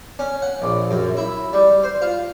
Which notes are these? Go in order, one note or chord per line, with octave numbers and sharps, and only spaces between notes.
C#4
F#5
A#1
F#2
E4
G3
C5
F4